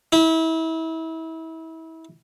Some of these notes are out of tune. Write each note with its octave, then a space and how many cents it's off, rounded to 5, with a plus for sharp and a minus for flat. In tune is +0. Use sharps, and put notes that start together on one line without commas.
E4 -30